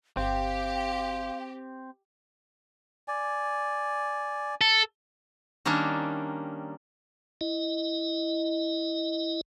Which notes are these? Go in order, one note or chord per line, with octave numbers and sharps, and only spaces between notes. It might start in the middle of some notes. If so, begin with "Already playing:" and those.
G1 C4 G4 F5
D5 G#5
A4
D#3 G3 A#3 C#4 D4
E4 D#5